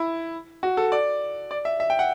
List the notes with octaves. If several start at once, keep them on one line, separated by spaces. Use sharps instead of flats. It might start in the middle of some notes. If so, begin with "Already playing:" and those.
Already playing: E4
F#4
A4
D5
D5
E5
E5
G5
F#5